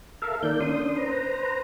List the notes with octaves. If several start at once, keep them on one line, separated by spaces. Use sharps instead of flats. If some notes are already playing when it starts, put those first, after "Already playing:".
A4 A#4 E5 F5
D#3 A#3 D5 G6
C#4 D4 C6 D#6
B4 C5 A#5